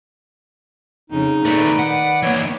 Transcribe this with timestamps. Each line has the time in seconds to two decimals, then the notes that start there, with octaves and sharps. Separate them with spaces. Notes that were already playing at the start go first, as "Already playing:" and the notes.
1.10 F2 C#3 D#4
1.45 A#2 D#3 A3 B4 D5
1.79 F#5
2.23 E3 A#3 C#5